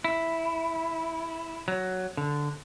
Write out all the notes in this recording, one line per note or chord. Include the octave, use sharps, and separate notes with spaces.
E4
F#3
D3